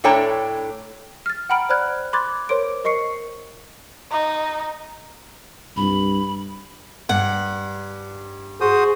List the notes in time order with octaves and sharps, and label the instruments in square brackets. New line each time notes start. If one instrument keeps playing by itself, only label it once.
[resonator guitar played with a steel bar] A2 D4 A4 C#5 G5 A#5
[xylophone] F6 A6
F#5 G5 A#5 B5 F6 D7
C5 D5 B5 F6 F#6 G#6
B5 C6 D6 F#6 G#6 A6
A#4 C5 C#5 C6 D6 D7
A#4 D#5 C#6 C7 C#7
[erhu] D#4
[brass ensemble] C2 G2 [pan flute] B5
[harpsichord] G2 [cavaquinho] F#5
[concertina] F#4 C5 D#6 [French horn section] G#4